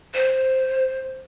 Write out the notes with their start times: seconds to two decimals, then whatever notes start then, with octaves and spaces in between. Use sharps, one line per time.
0.14 C5